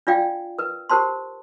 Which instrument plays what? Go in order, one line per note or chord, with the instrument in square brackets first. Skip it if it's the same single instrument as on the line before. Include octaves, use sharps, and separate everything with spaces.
[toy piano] D4 F4 D5 F5 G5
A#4 B4
G4 A#4 C5 A5 C6